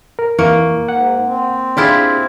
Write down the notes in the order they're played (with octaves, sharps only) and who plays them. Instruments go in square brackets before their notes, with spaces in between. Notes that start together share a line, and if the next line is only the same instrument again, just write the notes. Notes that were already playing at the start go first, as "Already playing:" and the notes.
[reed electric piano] A#4
[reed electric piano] F2 E3 C#6 [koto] A#3
[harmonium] G#2 [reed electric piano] F#5
[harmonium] C4
[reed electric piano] D4 G#4 [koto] E4 F4 G4